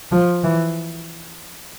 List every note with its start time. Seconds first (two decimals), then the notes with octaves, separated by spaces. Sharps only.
0.12 F3
0.44 E3